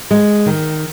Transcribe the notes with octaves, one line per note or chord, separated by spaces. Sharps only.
G#3
D#3